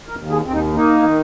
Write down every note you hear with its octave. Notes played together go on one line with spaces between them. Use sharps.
A#4
D#2
G#4
D#2 C4
D#4
A#3 D#4
D#3